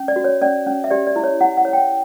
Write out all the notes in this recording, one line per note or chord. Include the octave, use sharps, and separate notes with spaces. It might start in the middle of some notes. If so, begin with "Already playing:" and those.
Already playing: C#4
D5
F#4
C#5
C#4 D5
C#4
E5
G4 D5
D5
E4
C#5
E4 F#5
F#5
C#5
G5